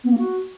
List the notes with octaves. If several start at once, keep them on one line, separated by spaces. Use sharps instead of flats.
B3
A#3
F#4